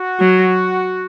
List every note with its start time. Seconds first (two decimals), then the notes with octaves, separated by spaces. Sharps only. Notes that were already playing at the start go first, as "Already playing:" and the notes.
Already playing: F#4
0.19 F#3